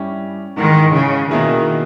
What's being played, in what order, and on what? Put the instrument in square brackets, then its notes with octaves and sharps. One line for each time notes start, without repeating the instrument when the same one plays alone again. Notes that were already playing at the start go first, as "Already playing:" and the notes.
Already playing: [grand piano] G2 G3 C#4 E4 G4
[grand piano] G#2 E3 G#3 [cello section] D#3
[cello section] C#3
[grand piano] B2 A#3 E4 G#4 [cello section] D#3